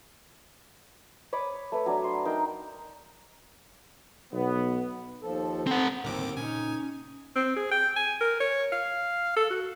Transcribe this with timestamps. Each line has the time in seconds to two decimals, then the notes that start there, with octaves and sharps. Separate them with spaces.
1.33 C#5 B5 D6 D#6
1.72 A3 B4
1.86 F#3 D4
2.04 C6
2.25 D#4 A#4 G5
4.33 B1 B3
5.23 D#2 F3 A4
5.67 C4 A4 F#5 A#5
6.04 G1 D#2 A2 C#3 C4 G4 A#4 D6
6.37 A#2 C#3 C#4 D#4 G#5
7.36 C4
7.56 G#4
7.72 G5
7.97 G#5
8.21 A#4
8.40 C#5
8.72 F5
9.37 A4
9.50 F#4